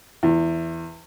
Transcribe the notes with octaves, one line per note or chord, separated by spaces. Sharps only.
E2